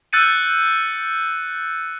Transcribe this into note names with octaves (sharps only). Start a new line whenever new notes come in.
E6 F#6 G6 A6 C#7 D#7